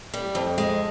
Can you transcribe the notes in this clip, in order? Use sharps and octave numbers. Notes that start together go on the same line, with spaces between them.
G3
F2
G#3